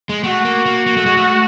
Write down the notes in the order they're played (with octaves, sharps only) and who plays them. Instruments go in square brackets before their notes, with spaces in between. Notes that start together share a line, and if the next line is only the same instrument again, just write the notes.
[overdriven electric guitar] G#3
[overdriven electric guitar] A3 [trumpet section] F#4
[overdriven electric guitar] A#3
A#3
A#3
A3
G#3
A3